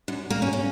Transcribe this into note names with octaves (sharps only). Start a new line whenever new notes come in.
F#2
A#3
C#4
C#4